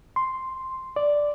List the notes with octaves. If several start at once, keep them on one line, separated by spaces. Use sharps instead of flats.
C6
D5